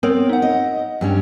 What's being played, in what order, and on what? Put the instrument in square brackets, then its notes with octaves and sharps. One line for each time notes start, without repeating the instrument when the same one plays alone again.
[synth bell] B3 A#4 C#5 [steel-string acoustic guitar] C4
[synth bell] D#4 F#5
[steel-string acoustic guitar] D#5
G2 G3 C#4